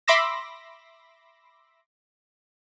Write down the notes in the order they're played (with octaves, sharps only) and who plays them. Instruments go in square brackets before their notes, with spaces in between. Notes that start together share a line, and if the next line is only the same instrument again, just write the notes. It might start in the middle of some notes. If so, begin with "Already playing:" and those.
[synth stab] E5 B5 C6 D6 E6 A#6